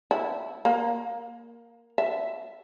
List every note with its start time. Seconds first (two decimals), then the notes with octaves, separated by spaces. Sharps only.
0.11 E4
0.65 A#3
1.98 E5